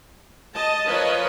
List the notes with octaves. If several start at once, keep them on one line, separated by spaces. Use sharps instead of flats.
D#5 A5
F3 F4 A#4 B4 C#5 D#5